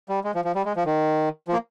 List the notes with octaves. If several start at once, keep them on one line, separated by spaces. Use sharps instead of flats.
G3
G#3
F3
F3
G3
G#3
F3
D#3
F3
A#3